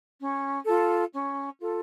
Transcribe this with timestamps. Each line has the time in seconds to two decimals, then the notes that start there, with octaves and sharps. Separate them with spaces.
0.20 C#4
0.66 F4 A4
1.12 C#4
1.58 F4 A4